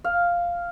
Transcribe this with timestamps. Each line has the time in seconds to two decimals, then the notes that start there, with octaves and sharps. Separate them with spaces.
0.04 F5